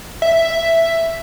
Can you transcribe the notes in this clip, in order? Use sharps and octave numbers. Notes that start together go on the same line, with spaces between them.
E5